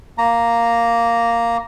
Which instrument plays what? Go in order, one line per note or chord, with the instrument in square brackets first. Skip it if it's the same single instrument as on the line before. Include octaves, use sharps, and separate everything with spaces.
[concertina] A#3 A#5